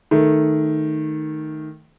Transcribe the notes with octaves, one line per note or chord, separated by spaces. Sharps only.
D#3 A3